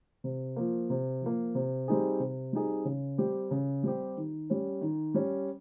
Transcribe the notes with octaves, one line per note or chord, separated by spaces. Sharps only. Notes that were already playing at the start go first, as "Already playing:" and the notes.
C3
F3 A#3
C3
F3 A#3
C3
G3 C4 D#4 G#4
C3
G3 C4 D#4 G#4
C#3
G3 C4 G4
C#3
G3 C4 G4
D#3
G3 C#4
D#3
G3 C#4